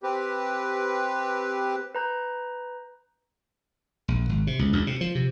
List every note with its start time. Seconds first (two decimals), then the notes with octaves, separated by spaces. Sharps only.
0.03 C4 G4 B4
1.95 B4 A#5 G6
4.08 A#1
4.29 G#1
4.47 C3
4.59 C#2
4.73 C#2
4.87 C3
5.01 F3
5.15 C3